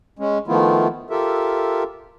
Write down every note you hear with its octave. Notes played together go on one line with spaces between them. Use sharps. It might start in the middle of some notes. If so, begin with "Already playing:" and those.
G#3 C#4
D#3 F3 A3 B3 E4 F4
F4 G4 A4 A#4 E5